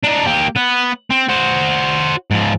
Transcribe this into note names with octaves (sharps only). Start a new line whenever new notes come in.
D4 D#4
A#3 G4
B3
C4
F#4 C5
G#2 F3